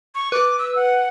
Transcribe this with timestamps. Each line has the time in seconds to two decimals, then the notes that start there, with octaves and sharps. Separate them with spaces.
0.15 C#6
0.32 B4 D6
0.59 E6
0.76 F#5